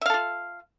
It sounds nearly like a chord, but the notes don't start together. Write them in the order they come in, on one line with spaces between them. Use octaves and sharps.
E5 F5 A4 F4